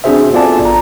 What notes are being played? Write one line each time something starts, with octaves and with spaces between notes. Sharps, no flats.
C4 D4 F#4 G#4 C5 E5
B3 F4 A4 D5 G#5 A5
A1 A#5